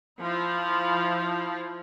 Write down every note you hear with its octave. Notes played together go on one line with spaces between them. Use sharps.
F3 E4